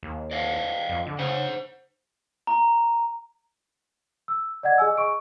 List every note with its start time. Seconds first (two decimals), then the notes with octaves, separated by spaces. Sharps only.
0.03 D#2
0.31 D5 D#5 F5
0.89 F2
1.07 D3
1.19 C#3 C5 F#5
2.47 A#5
4.28 E6
4.63 D5 D#5 F#5 G#6
4.78 G#4 D#5 G#5 E6
4.97 C#6 D7